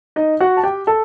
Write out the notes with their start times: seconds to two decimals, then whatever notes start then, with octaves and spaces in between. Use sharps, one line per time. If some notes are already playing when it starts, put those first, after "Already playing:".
0.16 D#4 D#5
0.40 F#4 F#5
0.57 A5
0.64 G4 G5
0.87 A4 A5